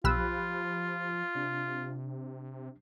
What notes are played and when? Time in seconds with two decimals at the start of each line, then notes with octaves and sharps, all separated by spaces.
0.04 B1 F3 F4 G4 B5 E6 F#6
1.35 C3 D4